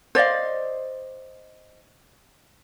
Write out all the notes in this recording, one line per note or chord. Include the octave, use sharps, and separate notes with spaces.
C5 D5 D#5 F5